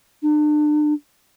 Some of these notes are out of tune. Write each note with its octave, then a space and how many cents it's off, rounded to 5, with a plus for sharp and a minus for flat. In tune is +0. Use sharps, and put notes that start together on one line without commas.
D4 +40